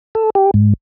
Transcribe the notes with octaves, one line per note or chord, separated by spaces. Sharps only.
A4
G4
G#2